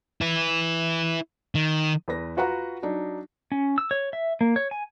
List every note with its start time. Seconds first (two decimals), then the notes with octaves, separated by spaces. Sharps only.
0.21 E4 B4
1.55 D#3
2.08 E2 B4 A#6
2.37 F4 F#4 B4 F#5 A#5 C#6
2.83 F#3 D4 D#4
3.52 C#4
3.78 E6
3.91 C#5
4.13 E5
4.41 A#3
4.56 C#5
4.71 G#5